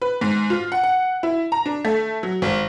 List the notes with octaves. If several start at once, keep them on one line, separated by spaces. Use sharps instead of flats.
B4
G#2
F4
F#5
F#5
E4
A#5
D4
A3
F#3
G#1